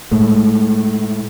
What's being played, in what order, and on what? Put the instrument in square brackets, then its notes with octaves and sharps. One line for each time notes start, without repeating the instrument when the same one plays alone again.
[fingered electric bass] A2 G#3 A3